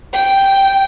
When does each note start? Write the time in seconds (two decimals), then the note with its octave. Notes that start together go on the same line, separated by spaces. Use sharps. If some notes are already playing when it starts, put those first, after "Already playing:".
0.14 G5